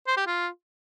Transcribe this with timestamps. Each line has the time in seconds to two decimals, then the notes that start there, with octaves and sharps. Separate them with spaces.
0.07 C5
0.17 G4
0.27 F4